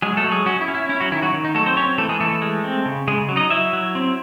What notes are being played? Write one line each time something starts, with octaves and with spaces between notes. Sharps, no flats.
F#3 G#3 G#4
A3 A4
F#3
G#3 G#4
F#3 C#4 F#4
E4
C#4
E4
C#4 E4
F#3 F#4
D#3 E4
F#3 F#4
D#3
D#4
F#3 A3 A4
C4 C5
C4 C#4 C#5
E3 A3 A4
G#3 G#4
E3 A3 A4
G#3
C4
C#3
C#3 G#3 G#4
F#3
D#4 D#5
F#3 E4 E5
F#3
C4